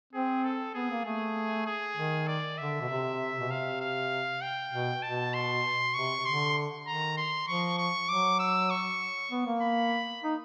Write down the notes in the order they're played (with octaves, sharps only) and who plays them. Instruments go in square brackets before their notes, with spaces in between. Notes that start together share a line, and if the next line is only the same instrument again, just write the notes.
[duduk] C4 [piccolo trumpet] G#4
[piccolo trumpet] A4
[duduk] B3 [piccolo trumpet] G#4
[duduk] A#3
[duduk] A3 [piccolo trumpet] G#4
[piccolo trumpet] G#4
[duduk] D#3
[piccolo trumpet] D5
[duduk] D3 [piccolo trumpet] E5
[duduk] B2
C3
B2
[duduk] C3 [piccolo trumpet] F5
[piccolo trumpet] F5
G5
[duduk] B2
[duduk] B2 [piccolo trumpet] A5
[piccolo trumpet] C6
[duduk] C3 [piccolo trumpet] C#6
[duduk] D3 [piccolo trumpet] C6
[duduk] D#3 [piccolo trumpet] A#5
[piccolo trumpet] C6
[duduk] F3 [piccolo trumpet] C#6
[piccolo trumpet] C#6
[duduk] F#3 [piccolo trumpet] D6
[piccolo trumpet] E6
C#6
[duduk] B3
A#3
[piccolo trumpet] B5
[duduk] D#4